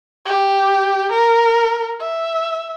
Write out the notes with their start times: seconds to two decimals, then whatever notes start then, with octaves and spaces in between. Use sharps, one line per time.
0.25 G4
1.12 A#4
2.00 E5